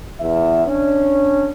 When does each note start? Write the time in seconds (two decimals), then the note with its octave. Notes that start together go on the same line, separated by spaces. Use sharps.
0.20 E2 E5
0.67 C#4 D4